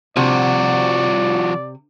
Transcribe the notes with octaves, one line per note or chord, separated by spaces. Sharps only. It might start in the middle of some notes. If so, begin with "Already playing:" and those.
C3 F3 F#4 D5